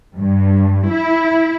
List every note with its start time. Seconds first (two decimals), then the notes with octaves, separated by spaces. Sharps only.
0.20 G2
0.91 E4